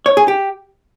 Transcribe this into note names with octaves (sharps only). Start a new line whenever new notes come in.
C#5
G#4
G4